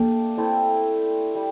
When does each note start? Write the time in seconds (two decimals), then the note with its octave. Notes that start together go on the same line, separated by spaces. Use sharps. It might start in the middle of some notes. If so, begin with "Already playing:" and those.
Already playing: A3 A#3 D4 G4
0.38 A3 C4 E4 A4
1.35 G3